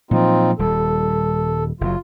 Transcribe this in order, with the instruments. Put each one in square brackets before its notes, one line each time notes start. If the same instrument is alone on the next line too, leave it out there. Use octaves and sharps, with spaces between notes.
[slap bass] A#2 F3 F#3 [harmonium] C4 D#4 F4
[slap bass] D#1 G3 [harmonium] A4
[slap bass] F#1 F#3 [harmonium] F4